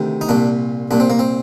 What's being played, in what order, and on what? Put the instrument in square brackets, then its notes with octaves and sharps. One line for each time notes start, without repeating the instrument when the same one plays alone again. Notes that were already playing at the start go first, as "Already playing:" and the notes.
Already playing: [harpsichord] D2 C3 D#3
D#4
C2 A#2 D4
C2 A#2 D4
C4
A#3
C4